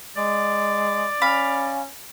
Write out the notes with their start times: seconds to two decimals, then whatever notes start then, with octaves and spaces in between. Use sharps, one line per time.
0.17 G#3 D5
1.22 C#4 F5 B5